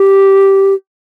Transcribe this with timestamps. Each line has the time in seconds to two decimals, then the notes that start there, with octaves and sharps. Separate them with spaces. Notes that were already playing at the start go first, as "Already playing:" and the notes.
Already playing: G4